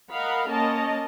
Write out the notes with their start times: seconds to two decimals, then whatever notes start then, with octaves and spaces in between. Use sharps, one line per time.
0.10 A#4 D#5 F5 F#5 B5
0.50 A#3 C#4 A#4 D#5 A5